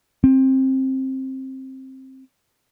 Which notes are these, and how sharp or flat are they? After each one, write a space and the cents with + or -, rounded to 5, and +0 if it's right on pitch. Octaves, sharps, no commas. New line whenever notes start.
C4 +15